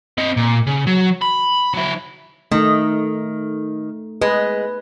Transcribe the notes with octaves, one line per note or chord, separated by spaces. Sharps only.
C4 D#5
A#2
C#3
F#3
B5
F#3 E4
D#3 A3 D#4
G#3 B4